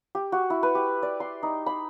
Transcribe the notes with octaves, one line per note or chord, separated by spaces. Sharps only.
G4
F#4
E4
B4
G4
D5
C6
D#4
B5